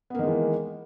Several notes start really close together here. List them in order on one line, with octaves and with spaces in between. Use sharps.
B3 A#3 D#3 G#3 E3